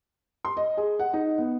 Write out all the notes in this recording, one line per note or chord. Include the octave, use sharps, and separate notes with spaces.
C6
D#5
G#4
F#5
D#4
B3